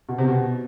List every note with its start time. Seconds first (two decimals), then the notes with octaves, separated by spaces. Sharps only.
0.09 B2
0.18 C3
0.28 B2